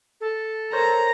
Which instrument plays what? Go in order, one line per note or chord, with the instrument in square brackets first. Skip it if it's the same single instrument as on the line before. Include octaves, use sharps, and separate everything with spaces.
[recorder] A4
[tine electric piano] A#4 C5 C#5 [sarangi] A#5